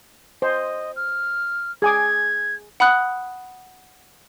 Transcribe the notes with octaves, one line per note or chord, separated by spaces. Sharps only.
C5 D#5
F6
G#4 G#5 D6 G#6
F#5 B5 D#6 F#6